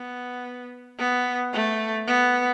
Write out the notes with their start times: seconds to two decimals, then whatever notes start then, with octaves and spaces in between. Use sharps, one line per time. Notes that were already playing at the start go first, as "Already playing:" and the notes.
Already playing: B3
0.99 B3
1.53 A3
2.08 B3